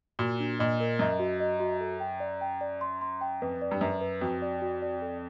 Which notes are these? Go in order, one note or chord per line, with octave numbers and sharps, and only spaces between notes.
A#2 F#4
D4
A#2 D#5
A#4
F#2 D#5
F#4
D#5
F#4
A4
G5
D5
G5
D5
C6
C6
G5
F2 B4
D5
G2
F#2 B4
B4
F2 F#4
D5
F#4
D5
A4